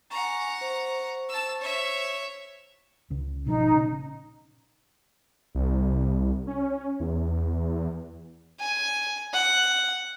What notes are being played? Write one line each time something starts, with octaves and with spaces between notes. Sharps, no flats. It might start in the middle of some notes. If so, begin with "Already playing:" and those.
F#5 G#5 A#5 C#6
C5 C#6
A5 E6
C#5 E5
C#2 C#3
G#1 B2 F3 D#4
A#2 C#3 C#4
C2
C#4
E2
G#5
F#5